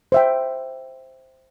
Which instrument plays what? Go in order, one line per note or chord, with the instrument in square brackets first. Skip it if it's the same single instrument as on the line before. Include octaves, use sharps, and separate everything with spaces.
[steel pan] C5 E5 G5